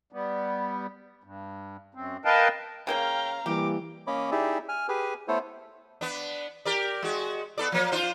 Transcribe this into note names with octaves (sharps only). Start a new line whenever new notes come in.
G3 B3
G2
F#2 C4
A#4 B4 D#5 F5 G5 A5
C#3 A#3 C#4 F5 G5 A#5
E3 G3 A#3 G4 D6
A#3 C#4 C#5 D#5 B5 D6
D#4 E4 G4 G#4 D5 E5
G#5 F6
G4 G#4 B4 G#5
A3 B3 E4 A4 C5 C#5
B3 D4
G4 A#4 D5
G#3 F#4
B3 A4 D5
F3 A#3
D4 F4 C5